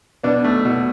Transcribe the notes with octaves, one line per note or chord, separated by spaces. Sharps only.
B2 B3 D4
A3
B2